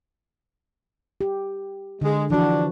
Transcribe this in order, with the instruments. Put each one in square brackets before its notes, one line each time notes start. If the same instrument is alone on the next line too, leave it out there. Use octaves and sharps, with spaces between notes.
[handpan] G4
[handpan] D3 [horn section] G#3
[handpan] E3 F3 F#4 [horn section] D4